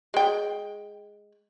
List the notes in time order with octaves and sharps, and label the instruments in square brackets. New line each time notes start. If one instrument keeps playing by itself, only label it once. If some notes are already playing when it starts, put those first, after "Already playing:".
[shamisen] G#3 G5